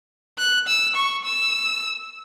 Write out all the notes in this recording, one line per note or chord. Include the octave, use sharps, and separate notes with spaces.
F#6
E6
C#6
E6